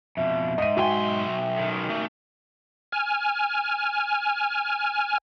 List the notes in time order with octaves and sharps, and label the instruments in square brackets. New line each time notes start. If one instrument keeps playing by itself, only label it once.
[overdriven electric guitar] F2 B2 [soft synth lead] E5
[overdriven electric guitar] G#2 [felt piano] D#5 D#7
[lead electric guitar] B1 C6 [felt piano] F#4 G5 G#5
[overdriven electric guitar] D#3 C#4
[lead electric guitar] A3
[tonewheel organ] G#5 F6